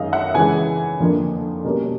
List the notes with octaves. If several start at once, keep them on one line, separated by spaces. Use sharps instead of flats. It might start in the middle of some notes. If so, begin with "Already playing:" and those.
Already playing: F#2 D#3 G#3 D#5 F5
E5 F#5
C#3 E3 G#3 F#5 G#5
F2 D3 F3 A#3 D4
B2 G3 A#3 C#4